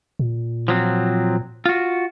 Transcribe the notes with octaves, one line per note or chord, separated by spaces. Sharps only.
A#2
F3 F#3 C4
F4 F#4